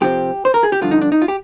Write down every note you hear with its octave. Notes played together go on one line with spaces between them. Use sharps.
F2 C3 F3 C4 G4
C5
A#4
G#4
G4
G2 D3 F3 F4
D#4
D4
D#4
F4
G4